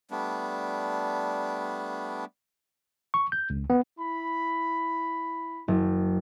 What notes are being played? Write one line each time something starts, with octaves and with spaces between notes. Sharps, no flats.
G3 A3 B3 D4
C#6
G6
C#2
B3
E4 B5
F#1